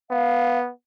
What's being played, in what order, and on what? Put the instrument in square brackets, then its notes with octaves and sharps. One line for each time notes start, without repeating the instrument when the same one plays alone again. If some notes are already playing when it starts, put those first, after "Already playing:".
[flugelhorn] B3 [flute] F5